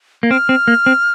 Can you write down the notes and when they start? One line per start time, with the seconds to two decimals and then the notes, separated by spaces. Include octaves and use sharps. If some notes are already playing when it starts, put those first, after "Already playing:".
0.23 A#3
0.31 C4 F6
0.49 C4
0.68 A#3
0.86 C4